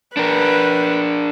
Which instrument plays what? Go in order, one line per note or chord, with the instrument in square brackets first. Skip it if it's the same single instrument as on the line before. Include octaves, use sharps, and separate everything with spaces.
[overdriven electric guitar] D4 A#4 [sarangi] B4